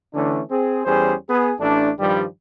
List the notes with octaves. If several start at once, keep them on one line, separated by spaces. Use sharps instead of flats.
D3 E3 A3 C#4 D4
C4 G#4
E2 G3 C#4 G#4 C5
B3 G#4
A1 A3 D4
G2 D#3 F3 G3